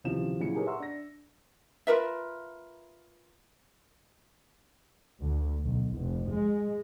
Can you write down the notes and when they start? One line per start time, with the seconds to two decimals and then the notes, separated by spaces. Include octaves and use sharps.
0.04 D#1 C#2 C3 E3 F3 E7
0.40 A#2 C#3 F#3 E4 C#7
0.54 D#4 G4 G#4 A#4 B4 C#5
0.67 E5 F#5 A#5 C6 C#6 E6
0.80 D4 A#6
1.87 F4 A#4 B4 E5
5.22 D2
5.64 B1
5.95 F1
6.29 G#3